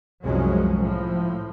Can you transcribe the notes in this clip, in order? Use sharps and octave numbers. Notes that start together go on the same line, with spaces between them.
C2 F#2 F3 F#3 G#3 C#4
A2 F3